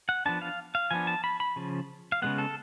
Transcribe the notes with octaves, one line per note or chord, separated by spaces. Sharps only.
F#5
F3 B3 D4 A5
F5
F5
F3 B3 D4 G#5
A5
B5
B5
C#3 F3
F5
C#3 F3 G#3 B3 F#5
A4